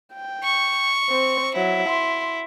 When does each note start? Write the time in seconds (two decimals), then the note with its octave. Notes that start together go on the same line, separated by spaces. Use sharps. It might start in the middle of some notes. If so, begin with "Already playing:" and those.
0.13 G5
0.43 C#6
1.09 C4
1.55 F#3 E4
1.89 C6